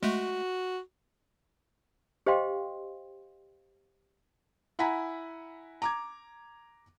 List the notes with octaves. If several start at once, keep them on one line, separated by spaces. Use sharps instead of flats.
G#3 A3 F#4
G4 C5 D#5 F5 G5 C6
E4 F#5 G#5 A#5 B5 B6
A#5 D6 G#6